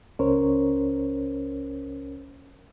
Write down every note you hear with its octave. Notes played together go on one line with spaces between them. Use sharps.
C#2 C#4 A#4 C5 C#5